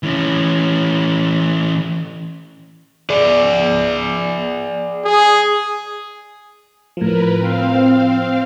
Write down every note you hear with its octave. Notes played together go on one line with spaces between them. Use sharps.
E3 C#4
G#4 D5
G#4
A2 F3 A#4 B4
C4 F5